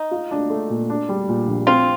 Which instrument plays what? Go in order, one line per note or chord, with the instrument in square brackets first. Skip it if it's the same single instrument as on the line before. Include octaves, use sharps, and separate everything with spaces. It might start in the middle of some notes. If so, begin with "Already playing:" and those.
Already playing: [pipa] D#4
[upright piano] F4
D4
A3
A#2
D4
G3
A#2
A#1
[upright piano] C4 [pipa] F4